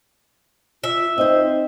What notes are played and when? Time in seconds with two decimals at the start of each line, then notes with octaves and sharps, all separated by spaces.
0.84 F4 E5
1.18 C4 D#4 C5 D#5